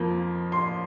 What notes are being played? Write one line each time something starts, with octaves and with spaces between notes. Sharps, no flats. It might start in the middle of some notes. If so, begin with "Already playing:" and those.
Already playing: F2 F3 A#3
C6